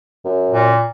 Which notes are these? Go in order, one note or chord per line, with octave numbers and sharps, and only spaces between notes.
F#2
A#2